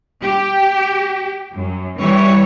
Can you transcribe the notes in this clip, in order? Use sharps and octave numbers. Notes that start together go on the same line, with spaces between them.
G4
F#2
E3 G3 C#5